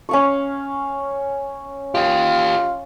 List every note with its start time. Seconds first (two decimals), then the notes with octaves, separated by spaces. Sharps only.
0.09 C#4 F5 C#6
1.95 F4 G4 D#5